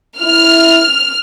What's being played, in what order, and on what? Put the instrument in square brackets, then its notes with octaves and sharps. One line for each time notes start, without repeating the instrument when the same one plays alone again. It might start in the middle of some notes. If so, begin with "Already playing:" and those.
[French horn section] E4 [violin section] F6